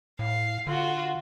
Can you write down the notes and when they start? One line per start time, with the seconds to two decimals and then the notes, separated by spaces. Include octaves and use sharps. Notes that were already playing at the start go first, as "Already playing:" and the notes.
0.19 A2 F5
0.67 D3 F4 F#4